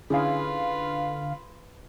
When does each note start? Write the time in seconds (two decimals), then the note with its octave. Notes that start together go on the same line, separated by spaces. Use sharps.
0.10 D3 C#4 E4 F4 G#4 B4 F5